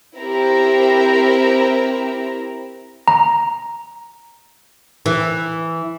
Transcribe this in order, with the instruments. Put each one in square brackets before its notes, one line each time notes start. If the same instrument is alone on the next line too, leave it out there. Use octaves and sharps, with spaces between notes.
[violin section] C4 E4 G4 A#4 C5 A#5
[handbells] A#5
[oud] E3